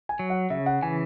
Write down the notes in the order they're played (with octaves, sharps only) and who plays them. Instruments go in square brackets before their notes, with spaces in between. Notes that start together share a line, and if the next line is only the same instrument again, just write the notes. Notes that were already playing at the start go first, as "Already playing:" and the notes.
[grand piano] G#5
[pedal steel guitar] F#3
[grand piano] F#5
[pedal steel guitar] C#3 [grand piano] E5
[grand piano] F#5
[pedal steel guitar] E3 [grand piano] G#5